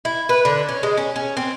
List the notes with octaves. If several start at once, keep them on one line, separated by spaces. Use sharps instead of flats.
E4
B4
D3
C#4
G#3
C#4
C#4
C4